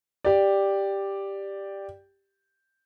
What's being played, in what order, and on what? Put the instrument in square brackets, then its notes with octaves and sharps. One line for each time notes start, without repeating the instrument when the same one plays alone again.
[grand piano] G4 D5